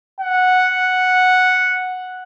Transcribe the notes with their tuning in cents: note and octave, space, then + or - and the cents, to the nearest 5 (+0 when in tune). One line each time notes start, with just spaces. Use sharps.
F#5 -5